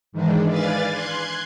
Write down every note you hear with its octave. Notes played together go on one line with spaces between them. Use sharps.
G#2 D#3 E3 G#3 D4
B4 D5 F5 G#5 A6
C6 F#6 G#6